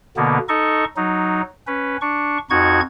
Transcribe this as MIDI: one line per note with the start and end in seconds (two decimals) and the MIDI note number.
0.17 0.38 47
0.17 0.38 50
0.17 0.38 58
0.17 0.38 59
0.49 0.85 63
0.49 0.85 69
0.49 0.85 75
0.49 0.85 85
0.97 1.42 54
0.97 1.42 63
1.67 1.97 61
1.67 1.97 71
2.01 2.38 62
2.01 2.38 85
2.50 2.81 41
2.50 2.81 63
2.50 2.81 66
2.50 2.81 85
2.50 2.81 92